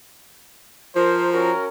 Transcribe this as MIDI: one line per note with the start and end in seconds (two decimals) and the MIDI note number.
0.96 1.52 53
0.96 1.27 70
0.96 1.27 72
1.33 1.67 61
1.33 1.67 66
1.33 1.67 70